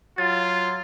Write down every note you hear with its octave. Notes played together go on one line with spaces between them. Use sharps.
F#3 F4 A6